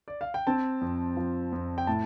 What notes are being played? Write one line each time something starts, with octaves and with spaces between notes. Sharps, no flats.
D5
F5
G5
C4 A5
F2
F3
F2
G5
A2 A5